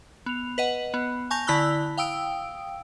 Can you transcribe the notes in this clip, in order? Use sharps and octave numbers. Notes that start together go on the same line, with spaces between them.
B3 F7
B4 D#5 F#5
B3
G#5 A5 C#6 G6 A#6 F7
D3 E4 B5 E6 F#6 G7
F5 G5 D#6 E6 D7